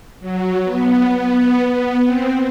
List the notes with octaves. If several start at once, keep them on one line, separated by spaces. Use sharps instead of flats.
F#3
B3
B3
B3
C4